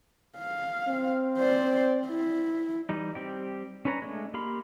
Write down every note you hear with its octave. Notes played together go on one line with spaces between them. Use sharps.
F5
C4
C5 D5
E4
E3 G3 D#4
G3 C4 G4
C#4 D4 B4 C#5 A#5
G#3 A3 D4
A#3 G4 F5 B5 C6